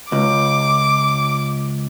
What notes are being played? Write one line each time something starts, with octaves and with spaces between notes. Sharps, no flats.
C#2 D6